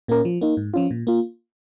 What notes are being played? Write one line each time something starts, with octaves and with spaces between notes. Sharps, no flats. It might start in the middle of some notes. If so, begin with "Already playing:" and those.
A#2 A#3 C#4 A#4
F3
A#3 D#4
G#2
F3 C#4 F4
A#2
A#3 F4